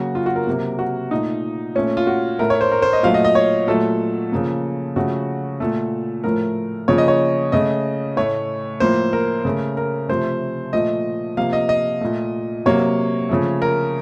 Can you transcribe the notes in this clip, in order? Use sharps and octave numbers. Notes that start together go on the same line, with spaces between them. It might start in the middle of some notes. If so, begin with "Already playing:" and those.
Already playing: C#3 F#3 A#3 F#4
F4
F#4
A#4
C3 F#3 A#3
F#4
A#2 A3 D#4
A#2 A3 C#4
F4
F#4
A2 A3 A#4
C#5
C5
A#4
C5
D#5
A#2 F#3 A3 F5
D#5
D#5
C#5
A#2 F#3 A3 A4
C#3 F3 A#3
C#3 F3 A3 F#4
A#2 A3 A4
A2 F3 A3 A#4
C#3 F3 A#3 C#5
D#5
C#5
C#3 A3 D#5
A2 A3 C#5
A2 F3 A#3 C5
A#4
C#3 A3
A#4
C3 F3 A3 C5
A#2 F3 A3 D#5
C3 F3 A#3 F5
D#5
D#5
A#2 A3
C3 F#3 A#3 C#5
C#3 F3 A3
A#4